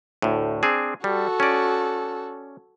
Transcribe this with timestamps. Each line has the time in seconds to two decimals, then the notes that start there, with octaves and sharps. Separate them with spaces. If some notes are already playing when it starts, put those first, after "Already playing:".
0.22 D2 A2
0.63 C4 D4 G#4
1.04 G3 F#4 A4
1.40 C#4 D5